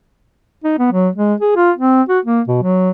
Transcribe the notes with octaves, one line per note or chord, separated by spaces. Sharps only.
D#4
B3
F#3
G#3
G#4
F4
C4
F#4
A#3
B2
F#3